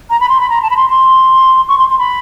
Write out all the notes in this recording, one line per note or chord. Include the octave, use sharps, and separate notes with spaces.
A#5
B5
C6
B5
A#5
A5
B5
C6
C6
C#6
C6
C6
B5